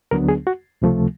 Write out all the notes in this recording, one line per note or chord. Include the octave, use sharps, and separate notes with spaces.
D2 D3 F#3 B3 D4 A#4
G#4
F#4
C#2 C3 F3 A3